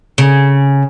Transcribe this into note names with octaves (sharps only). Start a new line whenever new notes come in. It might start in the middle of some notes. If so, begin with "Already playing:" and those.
C#3